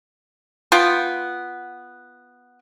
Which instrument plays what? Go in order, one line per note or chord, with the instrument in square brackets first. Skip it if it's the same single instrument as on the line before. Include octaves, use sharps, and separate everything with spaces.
[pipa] B3 F4 G5